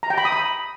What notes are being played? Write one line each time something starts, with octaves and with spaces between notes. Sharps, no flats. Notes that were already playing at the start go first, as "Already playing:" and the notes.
A#5
G5
B5
D#6
B5